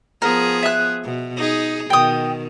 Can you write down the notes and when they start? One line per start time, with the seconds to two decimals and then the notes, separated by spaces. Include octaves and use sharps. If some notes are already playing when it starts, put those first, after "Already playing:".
0.22 F3 B3 G#4 A#4
0.63 E5 F#6
1.04 B2
1.37 D#4 G#4
1.90 B2 D#3 G5 D#6